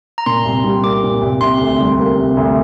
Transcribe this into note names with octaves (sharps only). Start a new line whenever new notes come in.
A#5
A#2 C6
C2
G3
A#3 D6
A#2
C2
C3 C6
D2
G3
A#3
C3
D2